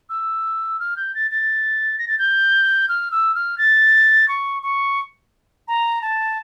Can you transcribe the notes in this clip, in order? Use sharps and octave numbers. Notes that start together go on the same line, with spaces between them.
E6
F6
G6
A6
A6
A#6
A6
G6
F6
E6
F6
A6
C#6
C#6
A#5
A5